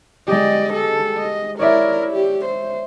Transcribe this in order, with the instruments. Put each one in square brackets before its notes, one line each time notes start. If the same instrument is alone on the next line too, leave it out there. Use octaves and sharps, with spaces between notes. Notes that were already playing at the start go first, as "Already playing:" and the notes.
[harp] G#3 G4 [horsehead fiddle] D5 D#5
[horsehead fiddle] A4
D#5
[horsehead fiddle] E4 A#4 [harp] C#5 D5 E5
[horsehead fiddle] G4
C5